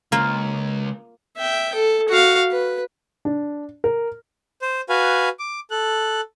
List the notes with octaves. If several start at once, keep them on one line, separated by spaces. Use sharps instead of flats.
C#2 A#3 F4
E5 G5
A4
F#4 F5
B4
D4
A#4
C5
F#4 B4 F5 G#5
D6
A4 F#6